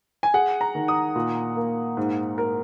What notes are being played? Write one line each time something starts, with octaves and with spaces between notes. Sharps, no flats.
G#5
G#4 F#5
A#5
D#3
D#6
A#2
A#3
G#2
A#4